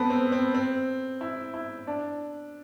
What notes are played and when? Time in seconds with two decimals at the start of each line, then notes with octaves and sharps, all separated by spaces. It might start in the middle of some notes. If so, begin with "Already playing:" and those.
Already playing: B3 C4 A4
0.10 C4
0.32 C4
0.54 C4
1.21 E4
1.54 E4
1.87 D4